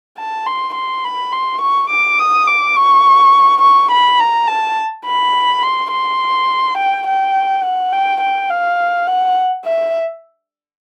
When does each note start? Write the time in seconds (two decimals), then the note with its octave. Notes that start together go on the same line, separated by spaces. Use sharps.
0.18 A5
0.46 C6
0.75 C6
1.04 B5
1.32 C6
1.61 C#6
1.90 D6
2.19 D#6
2.47 D6
2.76 C#6
3.62 C#6
3.91 B5
4.19 A#5
4.48 A5
5.06 B5
5.63 C6
5.92 C6
6.78 G5
7.07 G5
7.64 F#5
7.93 G5
8.21 G5
8.50 F5
9.07 F#5
9.65 E5